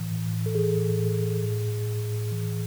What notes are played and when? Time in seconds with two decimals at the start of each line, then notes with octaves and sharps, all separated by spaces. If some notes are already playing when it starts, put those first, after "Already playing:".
Already playing: A2 E3
0.11 A2
0.33 A2
0.46 A4
0.55 E3 G#4
0.77 A2
0.99 A2
1.21 A2
1.43 A2
1.65 A2
1.88 A2
2.10 A2
2.32 E3